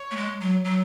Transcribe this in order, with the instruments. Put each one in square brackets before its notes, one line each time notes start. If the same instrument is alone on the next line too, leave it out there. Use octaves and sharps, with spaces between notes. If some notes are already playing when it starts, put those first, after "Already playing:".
Already playing: [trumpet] C#5
[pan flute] A3
G#3
F#3
F#3